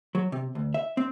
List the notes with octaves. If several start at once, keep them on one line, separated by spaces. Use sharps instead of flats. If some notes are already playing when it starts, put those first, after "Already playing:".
F#3
C3
D2
E5
C4